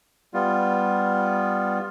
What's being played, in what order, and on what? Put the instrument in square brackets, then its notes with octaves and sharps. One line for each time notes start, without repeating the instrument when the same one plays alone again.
[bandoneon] G3 B3 F4